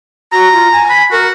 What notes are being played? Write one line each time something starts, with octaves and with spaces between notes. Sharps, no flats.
F#4 A#5
F4
G#5
B5
F#4 A#4